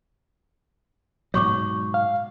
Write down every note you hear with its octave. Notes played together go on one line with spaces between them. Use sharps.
G#2 B2 F#3 C#5 C#6 D6
F5